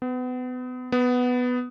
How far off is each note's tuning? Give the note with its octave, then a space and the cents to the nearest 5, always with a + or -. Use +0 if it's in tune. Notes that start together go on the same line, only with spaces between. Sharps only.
B3 +30
B3 +5